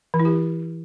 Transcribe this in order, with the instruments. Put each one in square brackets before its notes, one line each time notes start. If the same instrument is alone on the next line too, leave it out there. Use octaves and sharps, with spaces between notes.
[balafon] E3
E4
G4